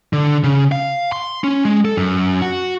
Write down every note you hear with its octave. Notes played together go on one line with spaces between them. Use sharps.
D3
C#3
F5
C6
C#4
G#3
A4
F#2
F#4